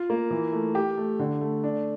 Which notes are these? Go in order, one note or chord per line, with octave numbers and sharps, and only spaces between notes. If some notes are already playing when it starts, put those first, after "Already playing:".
Already playing: F4
A#3
E3
A3
G4
A3
D3
A3
D4